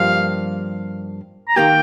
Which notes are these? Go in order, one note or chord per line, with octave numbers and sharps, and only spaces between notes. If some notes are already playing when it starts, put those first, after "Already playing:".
Already playing: G2 F3 A#3 F5
A#5
D#3 A#3 G4 G5